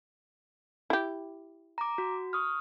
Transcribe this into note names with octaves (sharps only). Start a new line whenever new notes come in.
E4 G4
A#5 D6
F#4
C#6 D#6 F6